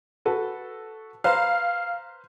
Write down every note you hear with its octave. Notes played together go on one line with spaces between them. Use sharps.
F#4 A4 B4
B4 C5 F5 A#5